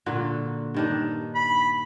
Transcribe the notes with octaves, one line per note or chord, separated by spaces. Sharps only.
A#2 D3 F#4
G2 D#3 D4
B5